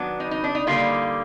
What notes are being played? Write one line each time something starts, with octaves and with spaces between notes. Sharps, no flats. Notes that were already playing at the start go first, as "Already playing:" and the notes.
Already playing: D#3 F#3 B3 D4
D#4
D#4
D4
D#4
D3 G3 A#3 D#4 F4